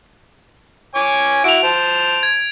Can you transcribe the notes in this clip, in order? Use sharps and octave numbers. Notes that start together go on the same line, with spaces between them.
C#5 G#5 D6
E4 F#4 D7 F7
C5 A5
G#6